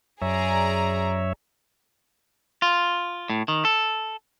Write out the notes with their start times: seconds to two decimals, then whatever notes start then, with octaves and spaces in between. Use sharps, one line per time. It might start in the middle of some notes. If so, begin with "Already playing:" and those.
0.22 F#2 G#4 C#5 D5 E5 A#5
2.62 F4
3.30 A2
3.48 D#3
3.65 A4